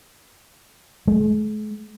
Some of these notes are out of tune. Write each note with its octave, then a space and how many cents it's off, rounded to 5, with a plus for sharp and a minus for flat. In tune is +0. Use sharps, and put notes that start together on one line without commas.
G#3 +45